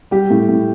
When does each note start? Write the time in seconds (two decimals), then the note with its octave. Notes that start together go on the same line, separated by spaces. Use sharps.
0.11 G3 G4
0.30 A2
0.49 A2